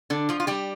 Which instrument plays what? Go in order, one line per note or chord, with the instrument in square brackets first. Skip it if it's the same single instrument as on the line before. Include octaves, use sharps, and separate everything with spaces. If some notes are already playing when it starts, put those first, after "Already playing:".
[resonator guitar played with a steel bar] D3 D4
F3 F4
F4
G3 G4